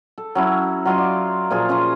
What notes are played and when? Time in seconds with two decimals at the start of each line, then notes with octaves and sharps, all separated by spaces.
0.18 A4
0.35 F#3 C#4 E4
0.85 F#3 F4 D#5 C6
0.98 D5
1.50 A#2 F3 F4 G#4
1.69 C#4 F4 G#5 A#5